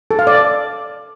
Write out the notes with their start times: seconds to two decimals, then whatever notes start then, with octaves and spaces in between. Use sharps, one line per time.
0.11 A4
0.19 F5
0.27 D5